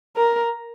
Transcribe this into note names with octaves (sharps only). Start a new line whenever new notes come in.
A#4